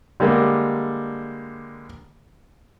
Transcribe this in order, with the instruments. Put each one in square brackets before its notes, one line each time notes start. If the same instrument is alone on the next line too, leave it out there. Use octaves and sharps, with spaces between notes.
[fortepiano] D3 G3 G#3 A#3